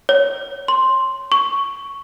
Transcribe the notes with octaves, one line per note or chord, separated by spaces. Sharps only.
C#5
C6
C#6